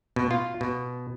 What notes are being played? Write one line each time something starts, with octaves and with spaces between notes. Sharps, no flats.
B2
F4
B2